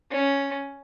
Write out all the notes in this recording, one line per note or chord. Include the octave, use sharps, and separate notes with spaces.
C#4